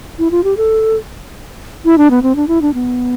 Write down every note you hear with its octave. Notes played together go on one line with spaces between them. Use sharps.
E4
F4
G4
A4
E4
D4
B3
C4
D4
E4
D4
B3